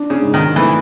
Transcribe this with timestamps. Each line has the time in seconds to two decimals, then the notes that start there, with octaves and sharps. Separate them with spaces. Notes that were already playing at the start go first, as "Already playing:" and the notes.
Already playing: D4
0.10 C#3
0.22 G#2
0.34 D#3
0.55 E3 A3